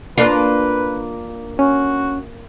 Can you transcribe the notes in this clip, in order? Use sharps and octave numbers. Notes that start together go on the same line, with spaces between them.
A#3 D4 F4 B4
C#4 F#4